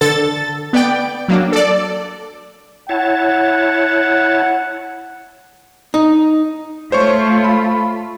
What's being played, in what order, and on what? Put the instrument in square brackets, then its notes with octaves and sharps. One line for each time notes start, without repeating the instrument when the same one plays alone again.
[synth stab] D3 A4 A6
B3 D5 G5
F#3 A#3 D4
A4 D5
[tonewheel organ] E4 C#5 A5 [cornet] F#5
[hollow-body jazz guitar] D#4
[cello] A3 F4 [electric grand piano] C5 C#5 C#6
[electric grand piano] B5